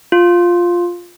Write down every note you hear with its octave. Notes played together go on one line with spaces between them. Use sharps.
F4